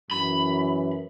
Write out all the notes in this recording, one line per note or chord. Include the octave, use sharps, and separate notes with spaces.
F#2 E3 B5